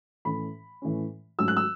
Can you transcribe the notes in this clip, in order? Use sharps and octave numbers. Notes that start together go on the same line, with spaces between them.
A2 E3 A3 C#4 B5
A2 E3 A3 C#4
G#2 F#3 A3 C#4 E6
F#6
E6